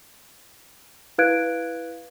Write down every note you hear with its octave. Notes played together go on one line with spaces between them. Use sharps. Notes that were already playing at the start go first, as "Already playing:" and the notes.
E4 B4 F5 F#6 G#6 D7